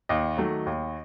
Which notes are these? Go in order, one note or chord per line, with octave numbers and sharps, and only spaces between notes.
D#2 D#5
D#3 F#3 A3
D#2